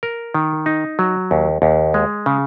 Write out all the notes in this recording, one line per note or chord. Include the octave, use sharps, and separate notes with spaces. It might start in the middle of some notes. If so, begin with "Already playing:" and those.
A#4
D#3
D#4
F#3
D#2
D#2
G#3
C#3